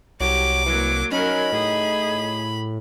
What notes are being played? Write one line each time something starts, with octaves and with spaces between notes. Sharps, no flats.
C2 F#3 G4 D6
E3 F#3 A#3
F#3 C#4 D#4 A#4 B5
A2 G#4